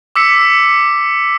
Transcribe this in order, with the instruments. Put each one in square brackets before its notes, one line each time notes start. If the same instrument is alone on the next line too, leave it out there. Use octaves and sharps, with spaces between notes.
[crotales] D6 E6 B6 C#7